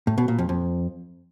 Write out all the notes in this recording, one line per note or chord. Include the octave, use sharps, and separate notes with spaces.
A2
B2
A#2
F2
F2